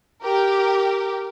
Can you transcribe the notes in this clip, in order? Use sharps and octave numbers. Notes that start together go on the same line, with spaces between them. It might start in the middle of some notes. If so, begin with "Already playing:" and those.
G4 A#4